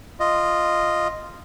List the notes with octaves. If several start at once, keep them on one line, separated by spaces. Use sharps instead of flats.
F4 D#5